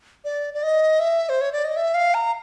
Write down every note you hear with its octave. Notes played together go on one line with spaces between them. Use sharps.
D5
D5
D#5
E5
C5
C#5
D5
D#5
E5
F5
A#5